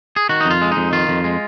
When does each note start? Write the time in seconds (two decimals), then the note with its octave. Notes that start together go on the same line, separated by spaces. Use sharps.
0.16 G#4
0.29 D#3 F#4
0.41 F2 D#4
0.51 F4
0.61 G#3
0.72 D#4
0.77 F2
0.93 D#3 F4
1.09 F2
1.24 G#3